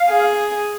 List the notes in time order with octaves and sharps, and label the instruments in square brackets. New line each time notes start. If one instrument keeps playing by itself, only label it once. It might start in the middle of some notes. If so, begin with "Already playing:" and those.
Already playing: [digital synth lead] F5
[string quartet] G#4